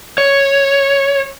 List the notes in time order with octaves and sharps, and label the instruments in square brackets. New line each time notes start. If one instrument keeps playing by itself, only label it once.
[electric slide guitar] C#5